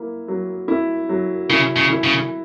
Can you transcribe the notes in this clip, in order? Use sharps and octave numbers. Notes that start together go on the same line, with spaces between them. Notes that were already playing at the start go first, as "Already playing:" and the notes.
Already playing: A#3 E4
F#3
E4
F#3
C#3 E4
C#3
E4
C#3